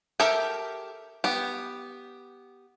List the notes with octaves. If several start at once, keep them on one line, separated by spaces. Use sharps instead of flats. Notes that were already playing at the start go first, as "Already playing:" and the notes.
G4 A4 A#4 E5 G5
B3 G4